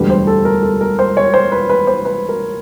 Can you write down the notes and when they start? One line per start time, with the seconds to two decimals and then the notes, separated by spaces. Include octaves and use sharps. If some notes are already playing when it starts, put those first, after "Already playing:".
Already playing: E1 D2 D3 G3 B4
0.10 C5
0.27 A4
0.45 A#4
0.63 A4
0.81 A#4
0.99 C5
1.17 C#5
1.34 C5
1.52 B4
1.70 B4
1.87 C5
2.05 B4
2.29 A#4